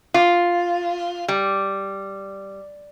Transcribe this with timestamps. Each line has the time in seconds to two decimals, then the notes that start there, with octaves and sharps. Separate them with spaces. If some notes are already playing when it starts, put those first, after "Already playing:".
0.14 F4
1.28 G3